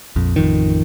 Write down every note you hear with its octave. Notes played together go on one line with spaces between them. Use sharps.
A#1 F2
A1 F2 D#3